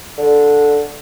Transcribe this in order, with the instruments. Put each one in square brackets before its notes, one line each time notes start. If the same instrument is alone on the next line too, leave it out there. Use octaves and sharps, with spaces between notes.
[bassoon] D3